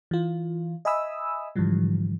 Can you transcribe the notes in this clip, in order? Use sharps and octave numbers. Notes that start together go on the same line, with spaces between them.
E3 F4
D#5 E5 G#5 B5 D#6 E6
G#2 D3 E3 F3 G3